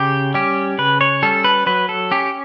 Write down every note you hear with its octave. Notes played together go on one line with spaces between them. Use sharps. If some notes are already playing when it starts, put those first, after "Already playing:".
Already playing: C#3 G4
G3 C#4 G4
C#3 B4
C#5
G3 C#4 A4
B4
F#3 B4
A4
C#4 G4